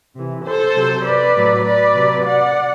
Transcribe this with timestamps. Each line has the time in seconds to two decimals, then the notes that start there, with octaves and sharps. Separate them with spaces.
0.16 C3 E3
0.45 A4 C5
0.75 C3 F#3
1.05 B4 D5
1.35 A2 F#3
1.64 B4 D5
1.93 C3 F#3
2.23 D5 F#5